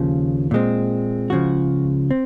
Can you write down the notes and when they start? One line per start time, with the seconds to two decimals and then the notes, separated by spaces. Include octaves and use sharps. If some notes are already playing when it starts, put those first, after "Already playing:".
Already playing: D#2 C#3 F3
0.51 A#2 G#3 C4
1.30 C#2 C#3 F3 F#4
2.11 C4